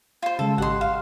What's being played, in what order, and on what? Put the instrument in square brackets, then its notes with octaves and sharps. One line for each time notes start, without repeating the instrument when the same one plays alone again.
[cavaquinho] F4 C5
[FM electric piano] C#3 G#3 [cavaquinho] A4
[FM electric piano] G#1 G4 D#5 [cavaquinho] F#5 C6
[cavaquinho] F5